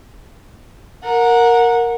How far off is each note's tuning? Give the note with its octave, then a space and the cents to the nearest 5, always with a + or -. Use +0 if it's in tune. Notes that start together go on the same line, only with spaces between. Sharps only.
A#4 +0 F#5 -20